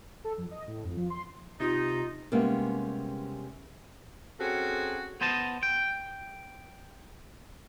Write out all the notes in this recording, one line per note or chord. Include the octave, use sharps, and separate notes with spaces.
A4
F2
D#5
A2
F2
F3
C6
C3 D#4 F4
C3 G3 G#3 A#3 B3 C#4
C4 C#4 F#4 G#4 A4
B3 C5 D#5 A5
G5